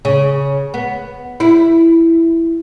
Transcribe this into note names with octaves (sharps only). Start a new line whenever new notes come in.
C#3
B3
E4